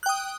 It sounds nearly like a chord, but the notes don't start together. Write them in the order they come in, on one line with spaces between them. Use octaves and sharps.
F#6 G5 D#6